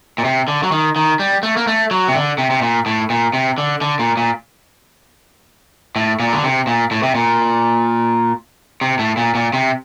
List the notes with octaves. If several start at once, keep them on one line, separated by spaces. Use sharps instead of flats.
A#2
C3
D3
F#3
D#3
D#3
G3
A3
A#3
A3
F#3
C3
D3
C3
C3
A#2
A2
A#2
C3
D3
D3
A#2
A#2
A2
A#2
D3
C3
A#2
A2
C3
A#2
C3
A2
A#2
A#2
C3